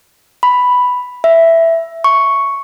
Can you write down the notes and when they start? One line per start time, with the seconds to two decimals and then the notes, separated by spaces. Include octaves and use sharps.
0.43 B5
1.24 E5
2.04 C#6